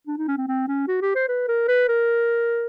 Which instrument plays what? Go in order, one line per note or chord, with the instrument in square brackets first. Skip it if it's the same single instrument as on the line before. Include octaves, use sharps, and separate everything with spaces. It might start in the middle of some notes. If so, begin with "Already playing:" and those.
[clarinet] D4
D#4
C#4
C4
C4
C#4
F#4
G4
C5
B4
A#4
B4
A#4